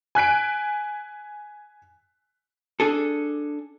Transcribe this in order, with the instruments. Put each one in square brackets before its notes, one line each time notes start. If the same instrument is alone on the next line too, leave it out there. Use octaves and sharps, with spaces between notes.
[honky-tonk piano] G#5 F#6 B6 D7
[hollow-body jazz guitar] D4 G#4 A4